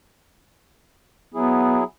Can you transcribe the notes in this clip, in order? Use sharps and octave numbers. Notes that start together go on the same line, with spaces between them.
F#3 B3 E4 G#4